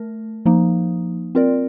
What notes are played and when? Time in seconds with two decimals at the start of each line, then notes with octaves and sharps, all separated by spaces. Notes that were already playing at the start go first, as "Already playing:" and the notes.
Already playing: A3 A#4
0.46 F3 A#3 D#4
1.35 C4 F4 A#4 D5